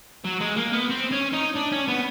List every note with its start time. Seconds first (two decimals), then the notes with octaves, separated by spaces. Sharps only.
0.24 F#3
0.40 G#3
0.56 A#3
0.73 B3
0.90 C4
1.12 C#4
1.33 D#4
1.55 D4
1.72 C#4
1.88 B3